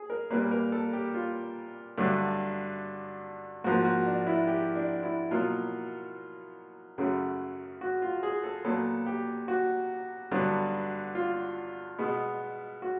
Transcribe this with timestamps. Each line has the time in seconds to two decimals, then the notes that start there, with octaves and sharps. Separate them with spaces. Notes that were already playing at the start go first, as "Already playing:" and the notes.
Already playing: G#4
0.10 A#4
0.31 A#2 G3 A#3 B4
0.51 A#4
0.72 A4
0.93 G4
1.14 F4
1.98 G2 D3 F#3 A3
3.64 G#2 F3 A#3 F#4
3.85 F#4
4.06 D4
4.27 E4
4.47 G4
4.75 D4
5.03 E4
5.31 B2 F#3 A#3 F4
6.98 F#2 C#3 F#3 A3
7.81 F#4
8.02 F4
8.23 G#4
8.44 A4
8.64 A#2 F#3 B3 A4
9.06 G4
9.48 F#4
10.31 G2 D3 F#3 B3
11.15 F4
11.98 B2 G#3 B3
12.82 F#4